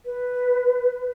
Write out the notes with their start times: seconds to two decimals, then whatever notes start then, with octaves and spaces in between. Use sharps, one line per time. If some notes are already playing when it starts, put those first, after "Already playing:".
0.05 B4